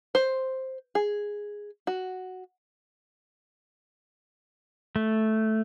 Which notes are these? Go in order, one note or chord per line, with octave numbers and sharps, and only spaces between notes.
C5
G#4
F#4
A3